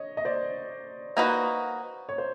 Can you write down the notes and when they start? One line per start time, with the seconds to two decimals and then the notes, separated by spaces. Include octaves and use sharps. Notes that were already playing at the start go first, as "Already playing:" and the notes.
Already playing: C#5 D#5
0.17 D#5
0.25 C5 D5
1.17 A#3 D#4 F#4 B4
2.09 C#5
2.18 C5